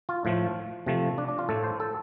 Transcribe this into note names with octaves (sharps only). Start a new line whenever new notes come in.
F4
A2 F3 A3
C3 F3 A3
D4
D4
F4
A2 A3 A4
C5
A4